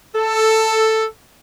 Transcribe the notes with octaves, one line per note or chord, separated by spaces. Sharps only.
A4